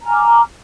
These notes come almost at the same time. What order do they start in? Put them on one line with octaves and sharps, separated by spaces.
A#5 G#5 F6 D6